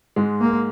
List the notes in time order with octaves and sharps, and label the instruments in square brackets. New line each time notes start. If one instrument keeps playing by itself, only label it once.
[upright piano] G#2 G#3
[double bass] A#3